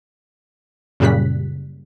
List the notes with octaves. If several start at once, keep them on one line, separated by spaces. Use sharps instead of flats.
F#2 A#2 C#3 G3 F#6 B6